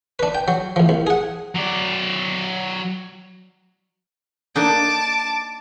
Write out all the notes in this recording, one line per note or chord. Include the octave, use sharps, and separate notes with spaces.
D4 B4
G5
F#3
A1 F3
C2
G#4 F#5
F#3 D5
A#3 D4 D#4 A5 D6